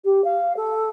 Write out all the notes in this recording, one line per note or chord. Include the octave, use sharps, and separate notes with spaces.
G4
F5
A4